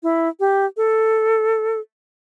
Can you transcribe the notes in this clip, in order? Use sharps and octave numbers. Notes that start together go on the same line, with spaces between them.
E4
G4
A4